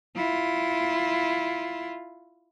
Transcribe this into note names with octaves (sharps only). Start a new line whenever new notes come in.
E4 F4